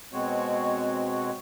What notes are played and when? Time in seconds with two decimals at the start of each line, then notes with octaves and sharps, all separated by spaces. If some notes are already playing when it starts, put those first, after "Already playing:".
0.13 B2 G#3 C4 F#4 C#5